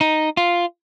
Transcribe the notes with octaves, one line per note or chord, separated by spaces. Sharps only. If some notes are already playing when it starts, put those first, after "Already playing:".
D#4
F4